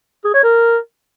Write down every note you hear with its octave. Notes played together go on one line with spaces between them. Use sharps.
G#4
C#5
A#4